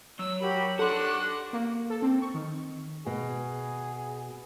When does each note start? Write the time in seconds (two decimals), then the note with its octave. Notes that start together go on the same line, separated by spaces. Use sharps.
0.19 F#3 E6
0.40 F#4 G4 A#4 B5
0.79 D4 G4 A4 F#5 C6 F#6
1.53 A#3
1.90 A4
2.02 C4
2.22 C#6
2.34 D#3
3.06 B2 G#4